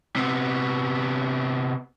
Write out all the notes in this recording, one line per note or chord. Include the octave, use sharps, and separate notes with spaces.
C3 B3